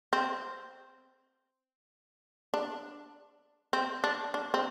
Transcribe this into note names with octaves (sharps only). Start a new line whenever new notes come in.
C4
D4
C4
D4
D4
C4